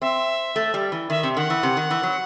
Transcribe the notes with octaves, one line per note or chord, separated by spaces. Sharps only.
C4 E5
A3
G3
E3
D#3 E5
C3
D#3 F#5
E3
C3
D#3
E3
F#3